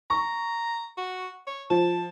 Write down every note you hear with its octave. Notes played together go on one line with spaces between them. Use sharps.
A#5 C#6
F#4
C#5
F3 A5